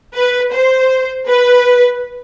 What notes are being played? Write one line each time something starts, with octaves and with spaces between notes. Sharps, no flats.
B4
C5
B4